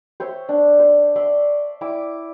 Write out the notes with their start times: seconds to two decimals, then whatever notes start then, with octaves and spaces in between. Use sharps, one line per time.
0.20 C5 C#5 E5
0.49 D4
0.79 C5 C6
1.16 D5 E5 C6 C#6
1.81 E4 E5 D6